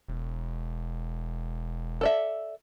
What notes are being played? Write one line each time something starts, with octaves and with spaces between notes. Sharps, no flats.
E1
A4 D5 E5